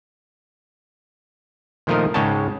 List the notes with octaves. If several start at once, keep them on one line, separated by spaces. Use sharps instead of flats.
A#2 D#3 F3 A3 A#4 D#5
G#2 C#3 G#3 C#5 G5 A5